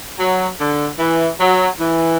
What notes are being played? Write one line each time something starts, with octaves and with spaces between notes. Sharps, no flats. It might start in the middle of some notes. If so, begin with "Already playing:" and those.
F#3
D3
E3
F#3
E3